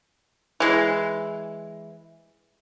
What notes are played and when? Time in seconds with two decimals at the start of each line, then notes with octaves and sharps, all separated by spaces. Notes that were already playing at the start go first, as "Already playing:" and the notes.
0.60 E3 G#3